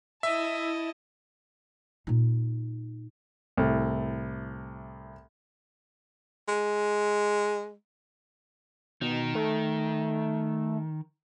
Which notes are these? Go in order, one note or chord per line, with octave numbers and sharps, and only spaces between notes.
E4 D#5 E5 A5
A#2 D#4
C2 A2 A4
G#3
B2 D#3
A3